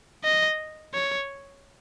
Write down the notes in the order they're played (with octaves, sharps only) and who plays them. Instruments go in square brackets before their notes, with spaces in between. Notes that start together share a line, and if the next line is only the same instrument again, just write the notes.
[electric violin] D#5
C#5